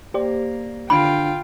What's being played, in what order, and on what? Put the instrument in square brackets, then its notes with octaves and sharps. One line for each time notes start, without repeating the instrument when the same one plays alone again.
[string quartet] A#3 [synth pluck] G4 C5 D5
[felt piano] D3 D7 [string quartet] F4 F5 G5 [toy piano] B5